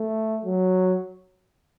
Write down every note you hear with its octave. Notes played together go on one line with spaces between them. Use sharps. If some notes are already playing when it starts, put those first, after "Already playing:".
Already playing: A3
F#3